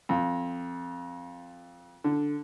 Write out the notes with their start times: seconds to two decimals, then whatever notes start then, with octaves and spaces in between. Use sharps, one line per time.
0.09 F2
2.04 D3